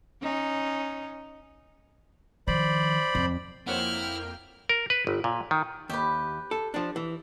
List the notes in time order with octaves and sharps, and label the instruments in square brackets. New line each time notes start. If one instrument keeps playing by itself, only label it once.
[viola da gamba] C#4 D#4
[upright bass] D#3 F3 [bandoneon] C5 D5 B5
[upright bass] F2
[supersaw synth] F2 A#3 G5 [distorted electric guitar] E4 [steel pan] C5 C#5 F#5 [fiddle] F6
[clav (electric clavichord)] A#4
B4
G1
A#2
D#3
[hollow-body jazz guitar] D#2 [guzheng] G4 B4
[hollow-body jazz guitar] A4
F3 D4
E3